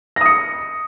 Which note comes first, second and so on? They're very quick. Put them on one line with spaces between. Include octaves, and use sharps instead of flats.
A#6 D#6 C#7